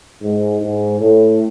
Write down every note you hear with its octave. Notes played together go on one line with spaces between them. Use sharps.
G#2
G#2
A2